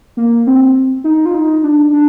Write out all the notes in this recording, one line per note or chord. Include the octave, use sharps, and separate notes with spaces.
A#3
C4
D#4
F4
D#4
D4
D4